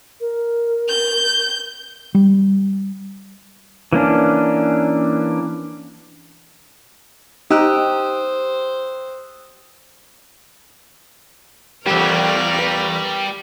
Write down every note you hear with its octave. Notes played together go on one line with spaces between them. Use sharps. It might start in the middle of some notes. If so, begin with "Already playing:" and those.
A#4
G6
G3
E3 A#3 C#4 D4
D#4 G4 C5 D#6 E6 F#6
E2 G3 A#3 G4 A#4 D5 E5
G4 B4